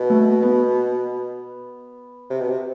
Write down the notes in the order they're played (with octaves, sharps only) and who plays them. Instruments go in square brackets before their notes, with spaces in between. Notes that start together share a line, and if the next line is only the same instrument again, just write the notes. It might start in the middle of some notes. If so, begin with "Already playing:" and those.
Already playing: [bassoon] B2
[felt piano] A3
B3
[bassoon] C3
B2
C3